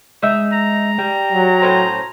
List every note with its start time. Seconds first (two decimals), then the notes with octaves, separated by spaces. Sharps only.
0.22 G#3 D#4 E5
0.53 A#5
0.98 G3 G5
1.32 F#3
1.62 A2 C#4 C5